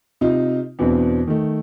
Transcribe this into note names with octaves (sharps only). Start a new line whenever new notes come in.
C3 D#4 F4
E2 B2 E3 C4 D4
D#3 A3